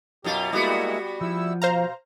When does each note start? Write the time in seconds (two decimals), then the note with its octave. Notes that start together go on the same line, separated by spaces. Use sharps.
0.24 F#2 B2 F4 G4
0.52 G3 G#3 A#3 B3 E4 F#4
1.21 F3 E4 E6
1.62 B2 C5 F5 A#5